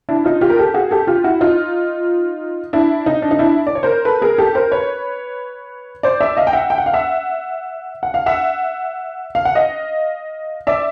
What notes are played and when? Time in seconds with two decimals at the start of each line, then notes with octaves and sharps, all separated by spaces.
0.09 D4 E4
0.25 D#4 F4
0.41 F4 G4
0.50 A#4
0.59 G4 A4
0.74 F#4 G#4
0.91 G4 A4
1.07 F4 G4
1.24 E4 F#4
1.41 D#4 F4
2.73 D4 E4
3.06 D#4
3.22 D4
3.31 D#4
3.39 D4 E4
3.67 D5
3.75 C#5
3.83 A#4 C5
4.05 A4 B4
4.22 G#4 A#4
4.38 G4 A4
4.55 A#4 C5
4.71 B4 C#5
6.03 C5 D5
6.20 D5 E5
6.37 D#5 F5
6.47 G5
6.53 E5 F#5
6.70 G5
6.78 F#5
6.86 F5
6.93 E5 F#5
8.03 F#5
8.14 F5
8.26 E5 F#5
9.35 F5
9.45 F#5
9.55 D#5 F5
10.67 D5 E5